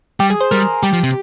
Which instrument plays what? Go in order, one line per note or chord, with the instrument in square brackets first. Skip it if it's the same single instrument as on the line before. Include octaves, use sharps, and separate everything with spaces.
[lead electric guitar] G3 [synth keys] G4
[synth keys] G#4
C5
[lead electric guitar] G3 [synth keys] A#4
[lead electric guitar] G3 [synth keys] G4
[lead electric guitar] F3
C3